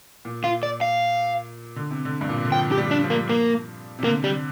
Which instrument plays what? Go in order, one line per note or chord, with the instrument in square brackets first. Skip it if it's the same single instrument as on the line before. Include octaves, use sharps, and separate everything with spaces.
[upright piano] A#2
[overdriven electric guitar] F4
D5
F5
[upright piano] D3
C3
D3
G2
A#2
C3
D3
[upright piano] F3 [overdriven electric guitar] G5
[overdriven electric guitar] G4
[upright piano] G3
[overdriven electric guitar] D4
[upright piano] F3
[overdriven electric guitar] A#3
A#3
[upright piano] C3
[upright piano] D3 [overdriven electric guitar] A#3
[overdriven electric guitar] G3